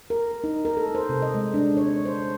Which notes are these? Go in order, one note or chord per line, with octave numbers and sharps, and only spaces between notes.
A#4
D#4
A#4
A4
C5
C3
D#5
G#3
D4
C#5
C5